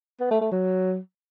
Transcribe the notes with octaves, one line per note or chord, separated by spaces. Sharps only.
B3
A3
A3
F#3